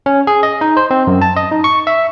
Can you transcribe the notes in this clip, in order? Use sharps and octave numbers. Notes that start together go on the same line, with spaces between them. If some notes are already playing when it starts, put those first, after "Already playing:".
C#4
G#4
D#5
D#4
C5
C4
F#2
A5
D#5
D#4
C#6
E5